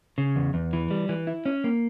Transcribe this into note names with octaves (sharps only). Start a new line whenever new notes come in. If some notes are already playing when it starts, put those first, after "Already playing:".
C#3
E2
E2
E3
G3
E3
E4
C#4
A#3